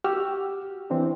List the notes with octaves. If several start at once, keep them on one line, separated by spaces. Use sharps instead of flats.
F#4 G4 E6 F6
E3 C4 D4